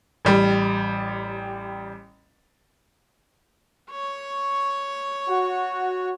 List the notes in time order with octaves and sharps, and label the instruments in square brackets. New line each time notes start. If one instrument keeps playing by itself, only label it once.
[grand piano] A1 G3
[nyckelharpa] C#5 C#6
[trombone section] F#4